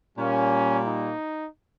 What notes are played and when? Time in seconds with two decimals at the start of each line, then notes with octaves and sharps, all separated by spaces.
0.17 A#2 G3 A#3 C#4
0.85 D#4